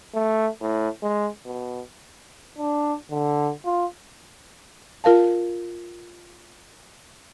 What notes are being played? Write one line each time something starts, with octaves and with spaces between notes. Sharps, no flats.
A3
A2
G#3
B2
D4
D3
F4
F4 A#4 F5 A5